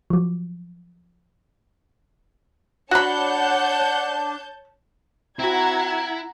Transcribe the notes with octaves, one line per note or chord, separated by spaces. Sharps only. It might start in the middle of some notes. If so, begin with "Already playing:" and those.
F3 F#3
D4 F#4 C#5 F#5 A5 B5 G6
C4 E4 F#4 F#5 A#5 G#6